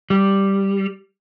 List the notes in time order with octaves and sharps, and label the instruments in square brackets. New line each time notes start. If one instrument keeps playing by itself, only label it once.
[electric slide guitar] G3